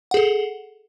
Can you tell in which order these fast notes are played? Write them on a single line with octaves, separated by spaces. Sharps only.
F#5 G#4 A4